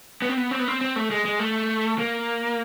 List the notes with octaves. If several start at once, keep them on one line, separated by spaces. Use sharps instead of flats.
B3
C4
B3
C4
B3
C4
C4
A3
G#3
G#3
A3
A#3